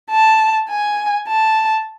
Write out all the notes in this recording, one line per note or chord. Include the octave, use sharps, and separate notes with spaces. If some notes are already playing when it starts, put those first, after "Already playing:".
A5
G#5
A5